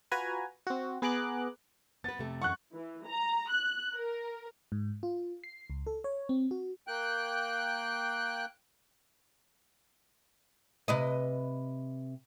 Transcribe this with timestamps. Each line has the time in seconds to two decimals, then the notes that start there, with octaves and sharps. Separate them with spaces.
0.11 F4 F#4 B4 G#5 A#5
0.67 C4 F#4
1.02 B3 G#4 A#5 D6 F#6
2.04 B3 B4 A6
2.18 F2 C3 A3
2.42 F#2 E3 F#5 C#6 F#6
2.73 E3
3.05 A#5
3.50 F#6
3.95 A#4
4.72 G#2
5.03 F4
5.44 C7
5.70 C#2
5.87 A4
6.04 C#5
6.29 C4
6.51 F#4
6.88 A#3 G5 F#6
10.88 C3 B4 D#5